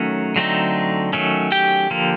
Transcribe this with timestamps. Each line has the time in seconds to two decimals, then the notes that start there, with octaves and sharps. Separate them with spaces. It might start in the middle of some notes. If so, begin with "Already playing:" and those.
Already playing: D#3 F#3 A3 C#4
0.36 D3 F#3 A3 C4 D#4
1.13 D#3 F#3 A3 C#4
1.52 G4 G5
1.90 D3 F3 A#3